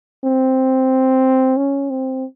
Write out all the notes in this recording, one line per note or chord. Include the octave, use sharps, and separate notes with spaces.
C4
C#4
C4